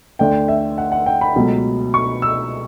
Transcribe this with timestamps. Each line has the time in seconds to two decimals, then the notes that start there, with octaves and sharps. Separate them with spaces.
0.19 D2 D3 A3 D4 G5
0.48 E5
0.78 F#5
0.92 F#5
1.06 G5
1.21 B5
1.36 C#2 B2 F#3 A3
1.94 C#6
2.22 E6